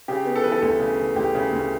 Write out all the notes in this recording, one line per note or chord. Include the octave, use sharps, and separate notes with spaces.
C#3 G4
B3
A4
E3 B4
A4
D2 A4
C#3
E3
D2 G4
C#3
D2